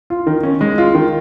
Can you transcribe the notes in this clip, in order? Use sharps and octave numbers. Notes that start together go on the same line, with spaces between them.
F4
D#3
C#4
G#3
F4
D#3